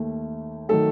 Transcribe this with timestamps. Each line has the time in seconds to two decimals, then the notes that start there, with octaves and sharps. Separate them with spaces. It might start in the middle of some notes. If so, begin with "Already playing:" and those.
Already playing: D#2 D#3 A3
0.69 D#3 F#3 A3 A4